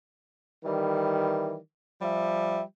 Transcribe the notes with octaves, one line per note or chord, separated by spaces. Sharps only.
D#3 E3 G3
F3 G3 E5